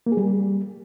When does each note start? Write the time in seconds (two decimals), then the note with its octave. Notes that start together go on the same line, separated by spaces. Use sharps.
0.06 A#3
0.12 G#4
0.17 G3